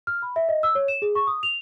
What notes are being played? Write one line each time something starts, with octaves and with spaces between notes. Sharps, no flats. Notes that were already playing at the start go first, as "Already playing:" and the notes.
F6
B5
E5
D#5
E6
C#5
E7
G#4
C#6
D#6
F7